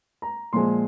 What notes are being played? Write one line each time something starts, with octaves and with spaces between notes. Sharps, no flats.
A#5
A#2 F3 G#3 C6